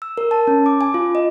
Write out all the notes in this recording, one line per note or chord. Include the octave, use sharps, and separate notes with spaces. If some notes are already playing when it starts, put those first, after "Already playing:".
E6
A#4
A5
C#4
D6
G#5
F4
D#5